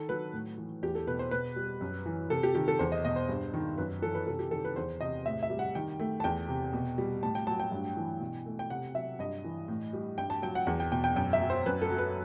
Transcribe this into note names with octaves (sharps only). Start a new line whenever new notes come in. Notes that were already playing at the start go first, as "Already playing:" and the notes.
Already playing: D#3 A4
F#3 B4
A2
E3
E2 G4
A4
B2 B4
C5
B2 B4
G3
F#2
E3
C3 A4
G4
D#3 G4
A4
E2 C5
D#5
B2 D#5
C5
G2
D#3
F#2 B4
E3 A4
B4
C3 A4
G4
D#3 A4
B4
E2 C5
C3 D#5
A2 E5
E5
G3
F#5
D#3 G5
A3
A5
E2 G5
C3
B2
G3
A2 A5
G5
F#3 A5
G5
G2
E3
B2
A3
G5
C3 F#5
F#3 E5
G2 D#5
E3
A2
G3
G2 G5
A5
F#3 G5
F#5
E2
G5
B2 G5
G5
F#2 G5
E5
F#3
C5
F#2 B4
A4
F#3
B4